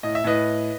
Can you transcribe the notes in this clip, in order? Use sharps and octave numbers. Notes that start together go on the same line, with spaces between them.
A2 D#5
E5
A2 B4 D#5